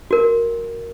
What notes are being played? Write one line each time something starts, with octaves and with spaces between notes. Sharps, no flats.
F#4 A#4